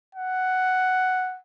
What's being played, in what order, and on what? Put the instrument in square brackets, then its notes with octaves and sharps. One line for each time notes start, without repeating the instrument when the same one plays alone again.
[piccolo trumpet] F#5